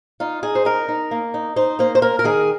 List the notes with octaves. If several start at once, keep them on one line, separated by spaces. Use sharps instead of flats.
D#4 F4
D#4 G#4
C5
D#4 A#4
D#4
A#3
D#4
D#4 C5
A#3 C5
C5
A#3 A#4
A#4
D#3 G#4